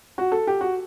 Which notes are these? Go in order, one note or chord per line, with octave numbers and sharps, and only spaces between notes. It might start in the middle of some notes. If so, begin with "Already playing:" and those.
F#4
A4
G4
F#4